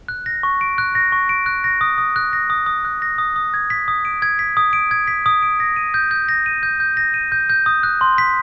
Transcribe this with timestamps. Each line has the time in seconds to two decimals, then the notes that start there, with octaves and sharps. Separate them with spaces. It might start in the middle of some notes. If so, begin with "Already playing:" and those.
0.08 F#6
0.26 A#6
0.43 C#6
0.61 D7
0.78 F#6
0.95 A#6
1.12 C#6
1.29 D7
1.46 F#6
1.64 A#6
1.81 D#6
1.98 D#6
2.16 F#6
2.33 A#6
2.50 D#6
2.66 D#6
2.85 F#6
3.02 A#6
3.18 D#6
3.36 D#6
3.54 G#6
3.70 B6
3.88 D#6
4.05 D7
4.22 G#6
4.39 B6
4.57 D#6
4.73 D7
4.91 G#6
5.08 B6
5.26 D#6
5.43 D7
5.60 A#6
5.76 D#7
5.94 G6
6.11 G6
6.29 A#6
6.46 D#7
6.63 G6
6.80 G6
6.97 A#6
7.14 D#7
7.32 G6
7.50 G6
7.66 D#6
7.83 F#6
8.01 C6
8.18 B6